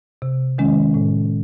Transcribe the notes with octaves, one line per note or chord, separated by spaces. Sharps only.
C3
D#3 G#3 C#4
A2